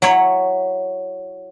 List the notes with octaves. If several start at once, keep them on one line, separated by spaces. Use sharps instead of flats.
F#3 E4 C#5